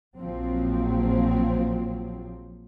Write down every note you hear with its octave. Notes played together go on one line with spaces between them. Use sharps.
A#1 F3 F#3 C4